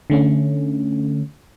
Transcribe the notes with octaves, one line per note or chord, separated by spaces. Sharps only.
D3 A3 C#4